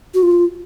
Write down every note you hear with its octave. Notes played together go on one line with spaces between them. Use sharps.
F#4
F4